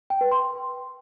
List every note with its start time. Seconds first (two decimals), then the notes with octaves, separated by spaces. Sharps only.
0.10 G5
0.21 B4
0.31 C6